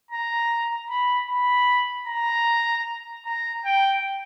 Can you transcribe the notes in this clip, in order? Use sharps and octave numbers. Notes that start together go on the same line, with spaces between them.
A#5
B5
B5
A#5
A#5
G5